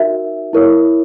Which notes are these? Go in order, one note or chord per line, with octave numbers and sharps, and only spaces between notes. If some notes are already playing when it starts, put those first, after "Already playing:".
Already playing: D#4 F#4 A#4 E5
E4 A#4 C#5